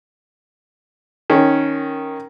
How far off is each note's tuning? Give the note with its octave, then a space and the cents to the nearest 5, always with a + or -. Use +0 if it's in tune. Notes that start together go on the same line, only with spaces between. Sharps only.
D#3 +0 C#4 +0